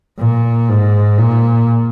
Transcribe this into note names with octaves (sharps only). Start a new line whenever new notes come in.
A#2
G#2
A#2